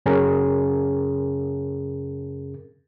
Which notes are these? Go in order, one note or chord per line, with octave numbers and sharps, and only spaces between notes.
F#2 C#3 C#4 G#4 A#4